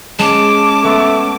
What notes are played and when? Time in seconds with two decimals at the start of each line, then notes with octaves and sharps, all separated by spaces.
0.19 G#3 C#4 A5 D6 E7
0.84 A3 B3